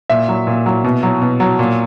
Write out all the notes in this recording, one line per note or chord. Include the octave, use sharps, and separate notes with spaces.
A#2 E5
F#3
A#2
F#3
B2
F#3
B2
F#3
A#2